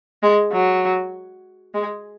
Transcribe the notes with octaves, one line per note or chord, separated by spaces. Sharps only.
G#3
F#3
G#3